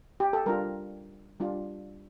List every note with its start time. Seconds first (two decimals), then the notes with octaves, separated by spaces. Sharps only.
0.20 G4
0.33 A4
0.46 G3 D4 F4 A#4
1.40 G3 D4 F4